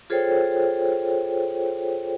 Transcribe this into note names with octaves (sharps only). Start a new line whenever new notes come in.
F4 G#4 A4 C5 C#5 G5